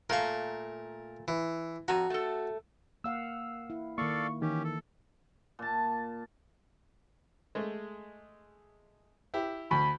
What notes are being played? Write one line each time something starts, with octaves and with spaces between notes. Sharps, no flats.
A#2 A3 A#4 F5 C#6
E3
F2 F#4 A#5
A3 A4
A#3 F5 F#5 E6
E4
D#3 A#3 A4 D5 F5 C#6
D#3 E3 C#4 G4
A4
A#2 A5
G#3 A3
E4 G4
D2 B5